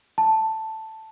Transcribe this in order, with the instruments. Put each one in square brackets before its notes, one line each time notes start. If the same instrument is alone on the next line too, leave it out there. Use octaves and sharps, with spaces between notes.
[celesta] A5